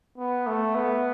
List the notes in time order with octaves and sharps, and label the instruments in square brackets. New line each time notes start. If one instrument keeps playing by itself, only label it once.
[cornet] B3
A3
B3